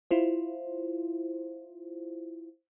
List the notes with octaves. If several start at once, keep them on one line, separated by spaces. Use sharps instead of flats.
E4 F4 C5